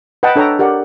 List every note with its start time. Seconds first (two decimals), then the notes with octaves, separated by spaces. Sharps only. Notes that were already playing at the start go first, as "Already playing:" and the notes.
0.23 B4 D#5 F#5 G5 A5 B5
0.36 D4 A4 C#5 G5 A#5
0.59 G4 A#4 D5 F#5